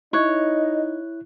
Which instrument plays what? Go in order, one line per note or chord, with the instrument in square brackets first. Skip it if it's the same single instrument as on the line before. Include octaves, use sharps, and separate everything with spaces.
[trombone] D#4 [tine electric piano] E4 F#6 [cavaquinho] C#5 [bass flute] D#5